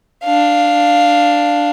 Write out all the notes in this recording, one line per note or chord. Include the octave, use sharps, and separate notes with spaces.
D4 F5